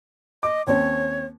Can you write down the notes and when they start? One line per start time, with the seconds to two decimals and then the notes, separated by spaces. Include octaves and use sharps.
0.43 D#5 D6
0.67 D#2 C4 C#4 C#5